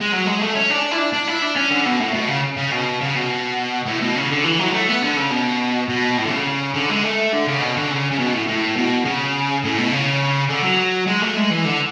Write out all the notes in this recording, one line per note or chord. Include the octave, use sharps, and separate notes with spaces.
G#3
F#3
G#3
A3
C#4
D4
E4
D4
D4
E4
D4
C#4
D3
B2
A2
B2
C#3
C#3
B2
C#3
B2
A2
B2
C#3
D3
E3
F#3
G#3
A3
B3
D3
C#3
B2
B2
A2
D3
C#3
D3
G#3
A3
D3
C#3
B2
D3
C#3
C#3
B2
A2
A2
B2
C#3
A2
B2
C#3
D3
F#3
G#3
A3
G#3
E3
D3